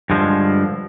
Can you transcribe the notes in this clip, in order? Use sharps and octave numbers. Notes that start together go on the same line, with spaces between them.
G2 D3 F3 G#3